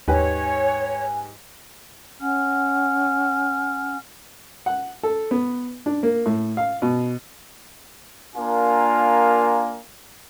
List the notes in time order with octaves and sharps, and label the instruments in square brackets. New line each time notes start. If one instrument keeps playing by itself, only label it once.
[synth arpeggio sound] D#2 [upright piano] G#2 G4 B4 [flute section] C#5 [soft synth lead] G#5
[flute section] C#4 F#5 G#5 F6
[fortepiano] F#5
A4
B3
D4
A#3
A2
F5
B2
[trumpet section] A#3 D4 F4 A#4 F5 G#5